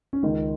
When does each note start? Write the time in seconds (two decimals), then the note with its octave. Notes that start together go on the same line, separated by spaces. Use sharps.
0.13 C#4
0.23 C#2 D#3 D#4